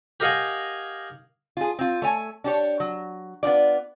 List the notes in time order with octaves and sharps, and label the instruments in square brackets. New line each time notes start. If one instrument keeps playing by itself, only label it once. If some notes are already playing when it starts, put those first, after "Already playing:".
[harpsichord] G4 A#4 D#5 F5 F#5 G#5
[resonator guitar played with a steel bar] F4 G#4
C4 F4
A3 C#5 G#5
D4 G4 C#5
F#3
B3 D4 F4 D5